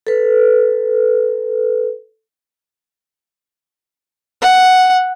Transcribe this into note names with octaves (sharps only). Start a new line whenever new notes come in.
A4 B4
F#5